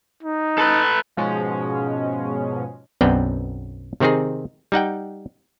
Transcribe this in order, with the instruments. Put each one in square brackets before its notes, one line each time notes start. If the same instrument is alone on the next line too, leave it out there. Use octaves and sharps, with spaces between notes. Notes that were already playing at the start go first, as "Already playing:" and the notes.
[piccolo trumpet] D#4
[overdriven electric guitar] A4 B4
[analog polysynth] G#2 B2 F3 G#3 C#4
[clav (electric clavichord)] B1 F#2 B3 C4 D5 G5
C3 D#3 C4 D#4 G#4
G3 D#4 F#5 G5